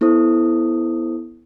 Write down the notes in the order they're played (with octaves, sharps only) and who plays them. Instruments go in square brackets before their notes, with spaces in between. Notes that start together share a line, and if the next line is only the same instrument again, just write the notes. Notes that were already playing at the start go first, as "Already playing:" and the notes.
[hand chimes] B3 E4 A4 C5 D#6